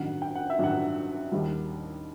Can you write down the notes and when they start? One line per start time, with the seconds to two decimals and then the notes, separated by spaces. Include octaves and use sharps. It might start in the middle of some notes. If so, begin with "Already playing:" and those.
Already playing: A1 G2 D#3 F#3 F#5
0.22 G5
0.35 F#5
0.50 E5
0.59 A1 G2 D#3 F#3 F#5
1.32 D#2 D#3 G3